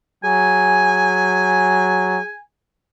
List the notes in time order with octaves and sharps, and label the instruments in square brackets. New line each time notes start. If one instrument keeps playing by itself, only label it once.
[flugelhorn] F#3 [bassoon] G#4 [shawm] G#5